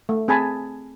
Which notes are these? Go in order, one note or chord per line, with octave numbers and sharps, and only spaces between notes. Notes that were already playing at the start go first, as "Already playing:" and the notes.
A3
C4 G#4 G#5 A5 B5